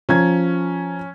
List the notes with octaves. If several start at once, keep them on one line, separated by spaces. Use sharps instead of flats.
F3 C#4 A#5 G#6